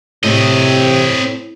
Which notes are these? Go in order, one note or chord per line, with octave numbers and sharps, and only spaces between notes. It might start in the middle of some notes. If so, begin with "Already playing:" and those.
A2 C3 C4 D#5